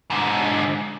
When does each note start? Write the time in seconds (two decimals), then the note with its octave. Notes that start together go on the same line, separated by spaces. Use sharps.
0.10 G#2 D3